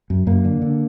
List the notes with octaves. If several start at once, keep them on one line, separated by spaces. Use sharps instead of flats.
F#2
F#2 A#3
D3
D3